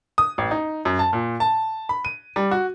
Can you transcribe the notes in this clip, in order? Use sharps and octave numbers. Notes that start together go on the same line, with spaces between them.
D#6
A1
D#4
F#2
A5
A#2
A5
B5
D#7
G3
F#4